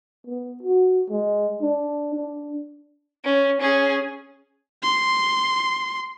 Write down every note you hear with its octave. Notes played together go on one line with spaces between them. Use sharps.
B3
F#4
G#3
D4
D4
C#4
C#4 G#4
C6